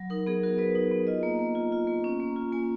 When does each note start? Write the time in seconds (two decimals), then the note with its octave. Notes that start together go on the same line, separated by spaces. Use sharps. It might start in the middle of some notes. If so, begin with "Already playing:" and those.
Already playing: F#3
0.10 D#4 A#4
0.27 B3 G#4
0.43 F#4 A#4
0.58 B3 B4
0.75 D#4
0.91 B3
1.07 F4 D#5
1.23 A#3
1.39 A#3
1.55 F4
1.72 F4
1.87 A#3
2.04 C#4
2.20 A#3
2.36 F4
2.53 A#3 G#5